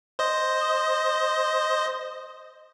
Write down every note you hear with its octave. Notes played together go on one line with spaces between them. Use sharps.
C5 D#5